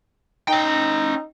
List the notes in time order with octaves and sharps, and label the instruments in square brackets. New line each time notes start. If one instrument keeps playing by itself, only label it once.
[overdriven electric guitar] C#4 G5 [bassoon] D#4